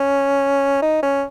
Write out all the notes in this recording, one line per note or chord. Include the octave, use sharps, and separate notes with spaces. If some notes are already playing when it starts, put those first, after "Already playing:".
Already playing: C#4
D#4
C#4